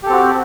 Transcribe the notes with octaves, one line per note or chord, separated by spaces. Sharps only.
C4 F#4 G4 A4